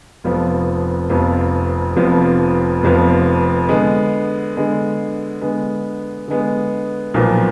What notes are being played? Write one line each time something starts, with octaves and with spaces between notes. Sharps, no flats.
F1 F2 F3 B3
F1 F2 F3 B3
F1 F2 F3 B3
F1 F2 F3 B3
D3 G#3 B3
D3 G#3 B3
D3 G#3 B3
D3 G#3 B3
B1 A#2 F3 B3